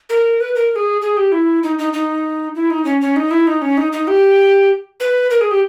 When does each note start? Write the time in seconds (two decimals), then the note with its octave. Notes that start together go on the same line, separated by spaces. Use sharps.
0.09 A#4
0.40 B4
0.55 A#4
0.71 A#4
0.76 G#4
1.02 G#4
1.17 G4
1.32 E4
1.63 D#4
1.79 D#4
1.93 D#4
2.55 E4
2.70 D#4
2.85 C#4
3.01 C#4
3.16 D#4
3.31 E4
3.47 D#4
3.62 C#4
3.77 D#4
3.92 D#4
4.08 G4
5.00 B4
5.31 A#4
5.41 G#4
5.51 G4